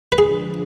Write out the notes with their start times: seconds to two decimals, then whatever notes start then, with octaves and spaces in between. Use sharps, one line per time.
0.12 B4
0.17 D3 F3 G#3 D4 G#4